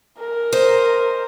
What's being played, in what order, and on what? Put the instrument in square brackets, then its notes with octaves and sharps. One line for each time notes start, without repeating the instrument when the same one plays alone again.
[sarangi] A#4
[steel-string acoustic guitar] C5 D#5